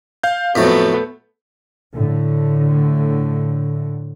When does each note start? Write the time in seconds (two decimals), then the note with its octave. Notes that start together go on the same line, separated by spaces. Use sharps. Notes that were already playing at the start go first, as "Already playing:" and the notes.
0.23 F5 G6
0.55 F2 A2 F#3 A3 B3 B6
1.94 A2 D3